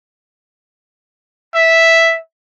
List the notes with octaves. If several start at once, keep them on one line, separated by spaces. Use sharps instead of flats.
E5